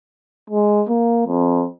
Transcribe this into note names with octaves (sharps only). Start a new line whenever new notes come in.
G#3
A#3
F2